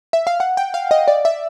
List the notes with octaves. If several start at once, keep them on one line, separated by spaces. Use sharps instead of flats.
E5
F5
F#5
G5
F5
D#5
D5
E5